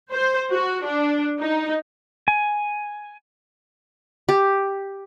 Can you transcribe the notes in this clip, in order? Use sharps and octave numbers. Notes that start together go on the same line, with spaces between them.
C5
F#4
D4
D#4
G#5
G4